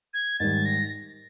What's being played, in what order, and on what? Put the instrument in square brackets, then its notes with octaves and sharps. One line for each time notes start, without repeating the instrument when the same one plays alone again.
[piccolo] G#6
[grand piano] G#2 D#3 G3 [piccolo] A6
[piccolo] A#6